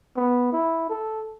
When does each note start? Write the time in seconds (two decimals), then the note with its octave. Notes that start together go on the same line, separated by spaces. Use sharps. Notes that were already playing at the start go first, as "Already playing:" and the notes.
0.17 B3
0.53 E4
0.90 A4